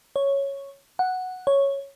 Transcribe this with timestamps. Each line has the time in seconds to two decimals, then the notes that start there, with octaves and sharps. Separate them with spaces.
0.16 C#5
0.99 F#5
1.47 C#5